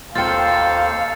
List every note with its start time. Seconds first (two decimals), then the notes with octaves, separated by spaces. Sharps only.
0.15 D#2 C4 F4 A4 C5 F5 A6 C#7